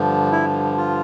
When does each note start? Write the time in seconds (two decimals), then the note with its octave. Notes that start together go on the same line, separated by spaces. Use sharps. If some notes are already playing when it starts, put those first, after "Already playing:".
Already playing: G2 D3 F3
0.32 E4
0.77 F4